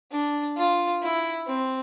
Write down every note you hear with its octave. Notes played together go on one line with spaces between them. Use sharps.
D4
F4
E4
C4